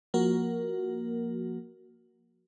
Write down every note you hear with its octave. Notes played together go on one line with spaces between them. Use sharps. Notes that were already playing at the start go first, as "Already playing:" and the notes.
F3 A#3 F#4 A#4